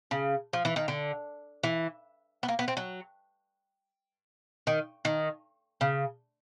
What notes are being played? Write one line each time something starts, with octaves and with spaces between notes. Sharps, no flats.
C#3
F3
E3
D#3
D3
E3
B3
A#3
B3
C4
F#3
D#3
D#3
C#3